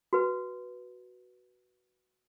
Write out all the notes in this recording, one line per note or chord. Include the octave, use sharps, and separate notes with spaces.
F#4 B4